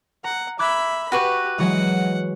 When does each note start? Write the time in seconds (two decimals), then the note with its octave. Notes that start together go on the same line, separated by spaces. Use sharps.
0.24 F#5 A#5
0.59 E5 B5 D6 F#6 G#6
1.12 F#4 G4 B4 C#6
1.58 E3 F#3 G#3 F#5